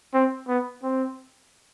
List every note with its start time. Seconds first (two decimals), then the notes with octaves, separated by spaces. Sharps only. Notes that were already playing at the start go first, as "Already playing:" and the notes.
0.14 C4
0.48 B3
0.83 C4